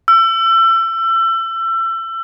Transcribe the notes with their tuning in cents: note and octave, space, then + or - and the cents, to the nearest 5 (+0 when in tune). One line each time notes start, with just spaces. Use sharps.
E6 +30